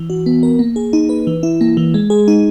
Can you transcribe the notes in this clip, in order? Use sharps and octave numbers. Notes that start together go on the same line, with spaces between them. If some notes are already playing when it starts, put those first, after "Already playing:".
Already playing: E3
F#4
B3
A#4
A#3
G#4
D#4
B4
E3
E4
A#3
E3
G#3
G#4
D#4